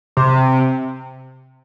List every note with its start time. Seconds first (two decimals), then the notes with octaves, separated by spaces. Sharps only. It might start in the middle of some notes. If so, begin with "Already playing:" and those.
0.17 C3